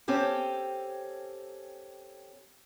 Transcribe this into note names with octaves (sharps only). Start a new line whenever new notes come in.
C4 C#4 G4 A4